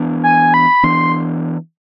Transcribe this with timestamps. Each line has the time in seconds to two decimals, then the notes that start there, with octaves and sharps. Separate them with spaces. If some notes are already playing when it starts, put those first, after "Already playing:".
Already playing: E3 B3 D4
0.24 G#5
0.54 B5
0.83 E3 B3 D4 C6